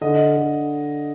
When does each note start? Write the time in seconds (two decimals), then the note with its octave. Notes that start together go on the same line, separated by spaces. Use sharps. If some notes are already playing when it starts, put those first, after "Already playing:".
0.01 D3 D#5
0.36 D3